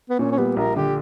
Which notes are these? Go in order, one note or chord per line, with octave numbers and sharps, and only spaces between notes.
B3
A#2 C#4
C#4
G3 B3
A#1 A#4
D3 G4